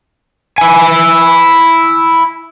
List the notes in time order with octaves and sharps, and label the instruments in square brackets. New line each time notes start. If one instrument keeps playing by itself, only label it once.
[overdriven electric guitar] E4 G#5